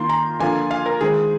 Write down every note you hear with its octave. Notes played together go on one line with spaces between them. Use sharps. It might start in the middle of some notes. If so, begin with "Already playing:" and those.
Already playing: D#3 A#3 F4 C6
A#5
D3 F3 A#3 F4 G#5
F5
A#4
D#3 G#3 C4 G#4